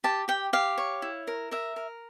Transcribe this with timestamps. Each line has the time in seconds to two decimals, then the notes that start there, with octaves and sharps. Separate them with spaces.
0.04 G4 A5
0.28 G4 G5
0.53 G4 F5
0.78 C#5
1.02 E4
1.27 A#4
1.51 A#4 E5
1.76 A#4